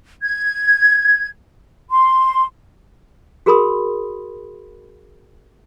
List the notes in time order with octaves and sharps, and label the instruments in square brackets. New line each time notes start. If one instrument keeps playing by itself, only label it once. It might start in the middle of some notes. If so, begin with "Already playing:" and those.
[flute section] G#6
C6
[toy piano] F#4 G#4 A#4 B5 C6 D#6